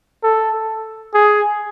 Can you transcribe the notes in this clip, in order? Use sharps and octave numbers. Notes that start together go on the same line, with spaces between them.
A4
G#4